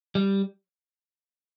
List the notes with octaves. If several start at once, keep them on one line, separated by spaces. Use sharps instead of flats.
G3